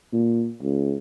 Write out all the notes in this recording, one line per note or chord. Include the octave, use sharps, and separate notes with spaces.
A#2
C#2